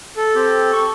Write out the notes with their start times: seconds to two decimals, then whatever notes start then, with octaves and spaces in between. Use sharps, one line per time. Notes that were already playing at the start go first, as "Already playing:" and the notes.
0.17 A4
0.35 C4 G4
0.73 C#6